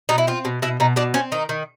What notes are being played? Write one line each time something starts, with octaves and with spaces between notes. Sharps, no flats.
B2 D#4
E4
C4 F4
B2
B2 E4
B2 D#4
B2 D4
C4 C#4
D#3 D#4
D#3